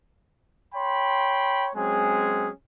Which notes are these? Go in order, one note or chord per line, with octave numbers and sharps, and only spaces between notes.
C#5 G5 B5 C6
F#3 G#3 C4 C#4 G#4